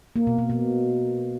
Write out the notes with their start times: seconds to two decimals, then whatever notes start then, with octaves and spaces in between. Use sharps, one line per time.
0.16 A#3
0.27 B2
0.38 B2
0.50 B2